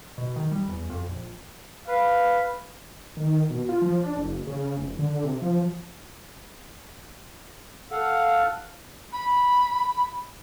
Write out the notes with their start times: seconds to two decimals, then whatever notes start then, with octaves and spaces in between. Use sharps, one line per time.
0.18 B2
0.36 D#3
0.51 G3
0.68 E2
0.90 F2
1.07 A#1
1.88 B4 F5
3.17 D#3
3.50 B2
3.69 F4
3.82 F3
4.03 D4
4.17 F#1
4.47 C#3
4.77 F1
4.99 D3
5.24 C3
5.41 F3
7.91 A4 F5 F#5
9.13 B5